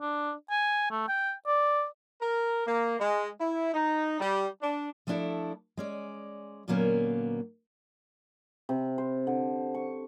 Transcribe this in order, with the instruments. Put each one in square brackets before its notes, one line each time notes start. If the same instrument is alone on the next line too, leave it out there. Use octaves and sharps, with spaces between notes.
[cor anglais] D4
G#5
A3
G5
D5
[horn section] A#4
A#3
G#3
E4
D#4
G3
D4
[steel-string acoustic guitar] F3 A3 B3 D4 E4 A4
G#3 C#4 D5
A#2 D3 F#3 A#3 B3 C#4
[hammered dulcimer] C3
C5
D3
C#6